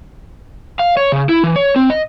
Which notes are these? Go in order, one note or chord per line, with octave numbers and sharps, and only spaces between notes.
F5
C#5
C#3
E4
E3
C#5
C4
D#5